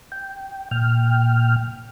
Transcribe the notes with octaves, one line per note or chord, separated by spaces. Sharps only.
G5
A#2 G5 F6